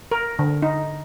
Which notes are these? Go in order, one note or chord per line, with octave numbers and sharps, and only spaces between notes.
A#4
D3
D#4